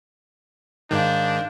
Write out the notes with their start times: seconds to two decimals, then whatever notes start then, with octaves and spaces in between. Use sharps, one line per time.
0.91 G#2 D#3 D4 F5 G6